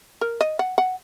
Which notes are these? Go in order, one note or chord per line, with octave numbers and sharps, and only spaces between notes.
A#4
D#5
F#5
F#5